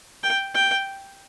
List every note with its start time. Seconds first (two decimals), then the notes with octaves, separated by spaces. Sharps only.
0.23 G5
0.54 G5